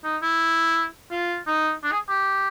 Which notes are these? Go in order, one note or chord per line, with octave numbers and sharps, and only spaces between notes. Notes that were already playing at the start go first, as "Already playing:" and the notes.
D#4
E4
F4
D#4
D4
G#4
G4